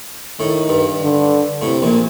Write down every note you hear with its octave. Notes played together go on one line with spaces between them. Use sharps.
A2 D#3
G2
D3
A2 C3
A#1 A#2